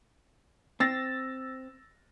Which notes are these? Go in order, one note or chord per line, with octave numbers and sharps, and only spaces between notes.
C4 E6 A6 A#6